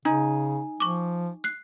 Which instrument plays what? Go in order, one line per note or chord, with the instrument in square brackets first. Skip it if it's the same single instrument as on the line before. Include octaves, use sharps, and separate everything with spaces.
[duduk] C#3 [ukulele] D#4 [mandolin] G#5
[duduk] F3 [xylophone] C#6 D6
[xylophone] F#6 C7